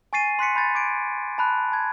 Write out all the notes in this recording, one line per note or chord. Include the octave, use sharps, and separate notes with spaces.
G#5 C#6 A6 C7 D#7
C6 F#6 B6 C#7
B5 G6 A6
D6 G#6 D7
A5 B5 F#6
A5 G#6